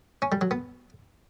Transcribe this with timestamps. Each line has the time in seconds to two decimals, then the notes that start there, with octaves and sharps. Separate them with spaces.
0.22 C#4
0.32 G3
0.41 F#3
0.51 B3